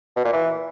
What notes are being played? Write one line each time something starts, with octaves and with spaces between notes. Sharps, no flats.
B2
A#2
E3